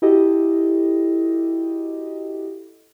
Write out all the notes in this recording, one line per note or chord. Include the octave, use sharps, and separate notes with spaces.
E4 F#4 G4 A4 D#5